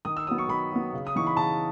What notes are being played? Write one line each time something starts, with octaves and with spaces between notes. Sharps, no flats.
D#3 D#6
E6
F#3 B3 D#6
C#6
D#3 B5
F#3 B3
C#3
D#6
E3 B3 D#4 C#6
B5
C#3 A5